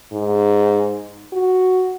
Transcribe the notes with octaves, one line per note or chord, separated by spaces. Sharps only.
G#2
F#4